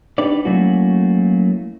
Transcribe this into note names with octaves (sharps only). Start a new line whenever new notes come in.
D4 D#4 G4 B4 D5
F#3 A3 A#3 C#4 E4 F#4